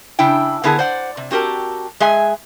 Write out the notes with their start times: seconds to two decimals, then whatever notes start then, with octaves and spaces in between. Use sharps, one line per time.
0.19 C#3 D4 E4 G5
0.64 D3 B3 E4 G#4 A#4 A5
0.79 C5 D5 F#5
1.17 C3
1.31 C4 F#4 G4 A#4 A5
2.00 G#3 G#4 E5 G#5